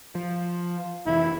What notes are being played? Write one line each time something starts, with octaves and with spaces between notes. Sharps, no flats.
F3
F1 E3 E4